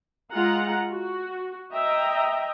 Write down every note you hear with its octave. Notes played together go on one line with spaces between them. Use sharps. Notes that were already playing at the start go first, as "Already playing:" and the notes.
G#3 F4 F#5 A#5
F#4
D#5 E5 G5 A#5